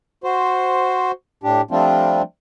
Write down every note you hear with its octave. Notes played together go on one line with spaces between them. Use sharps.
F#4 C5
A2 D4 G4
F3 G3 A3 C4 D4 F4